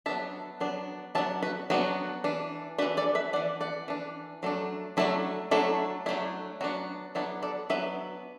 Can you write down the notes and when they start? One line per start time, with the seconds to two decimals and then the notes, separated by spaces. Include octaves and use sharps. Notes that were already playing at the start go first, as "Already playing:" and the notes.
0.06 F#3 B3 D4 E5 A5
0.61 F#3 B3 D4
1.15 F#3 B3 D4 E5 A5
1.43 F#4 B4
1.70 F#3 B3 D4 F#4
2.24 E3 D4
2.78 D4 F#4 B4
2.82 E3
2.97 A4 D5
3.15 B4 E5
3.33 E3 D4 D5 F#5
3.61 D5 F#5
3.88 E3 D4
4.43 F#3 A3 D4
4.97 F#3 A3 D4 E4 A4
5.51 F#3 A3 D4 E4 A4
6.06 F#3 A3 D4 E4
6.61 F#3 B3 D4 F#4
7.15 F#3 B3 D4 E4 A4
7.42 A4 D5
7.70 F#3 B3 D4 B4 E5